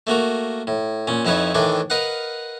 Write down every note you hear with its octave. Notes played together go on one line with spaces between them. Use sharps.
A3 A#3 F#4 A#4
A2
A#2 C#4
F2 F3 D#4 E4 B4 C#5
A2 D#3 E3 A3 D4 D5
A#4 B4 D#5 F5 F#5